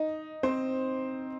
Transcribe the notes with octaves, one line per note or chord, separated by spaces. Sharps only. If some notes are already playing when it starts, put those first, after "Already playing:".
Already playing: D#4 D#5
C4 C5